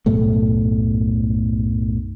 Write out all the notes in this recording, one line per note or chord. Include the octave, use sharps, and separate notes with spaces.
B1 F#2 A2 A3